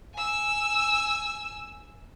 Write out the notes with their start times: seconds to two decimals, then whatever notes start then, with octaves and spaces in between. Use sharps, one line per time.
0.15 G#5 E6